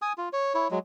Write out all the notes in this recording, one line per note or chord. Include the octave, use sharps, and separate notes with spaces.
G#5 D#6
F4
C#5
E4 C#5
F#3 G#3